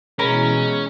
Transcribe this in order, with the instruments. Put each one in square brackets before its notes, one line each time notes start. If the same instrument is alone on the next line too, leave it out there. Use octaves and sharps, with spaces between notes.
[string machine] B2 E3 [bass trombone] G#3 [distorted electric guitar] C#4 [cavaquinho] A#4 A#5 B5